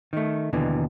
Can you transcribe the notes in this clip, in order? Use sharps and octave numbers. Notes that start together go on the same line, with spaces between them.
D#3 A3
D#2 B2 D3 E3